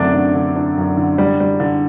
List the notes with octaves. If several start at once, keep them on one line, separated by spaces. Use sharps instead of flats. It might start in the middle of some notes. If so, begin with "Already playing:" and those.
Already playing: F#2 D3 A3 C4 D4 D5
D3
D3
D4
F#2
D3
G3
G3
D3